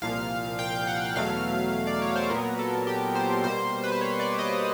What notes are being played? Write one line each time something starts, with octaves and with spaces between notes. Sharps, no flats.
C2 A#2 F3 F5
G5
F#5
E2 B2 F#3 A3 F5
D5
C#5
C5
A#2 F#3 B3 A#4
A4
G4
C5
B2 G3 A#3 C5
B4
C5
C#5
D5
D#5